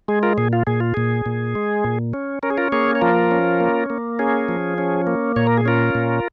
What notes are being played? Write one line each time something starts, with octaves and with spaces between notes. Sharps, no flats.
G#3 G#4
F4 A#4
A#2 G#4
F4
A#2 G#4
F4
A#2 G#4
A#2
G#3
A#2
C#4
C#4 A#4
G#4
F4 A#4
A#3 G#4 C#5
C#5
F3 F4 A#4
C#4
A#3
A#3
C#4 G#4
F3
C#4
A#3
A#2 C#5
A#4
G#4
C#4 F4 A#4
A#2